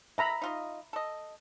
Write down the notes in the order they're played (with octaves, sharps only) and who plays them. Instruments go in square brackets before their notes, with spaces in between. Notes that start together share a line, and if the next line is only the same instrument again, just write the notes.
[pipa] A3 [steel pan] E5 A#5 B5
[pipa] D#4 F4 D#5
A4 D#5